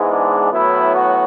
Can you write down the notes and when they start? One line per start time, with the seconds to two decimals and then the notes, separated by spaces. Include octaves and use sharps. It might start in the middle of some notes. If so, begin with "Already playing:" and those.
Already playing: G#2 E3 G#3 B3
0.10 D4
0.52 A2 F#3 B3 E4
0.95 F#4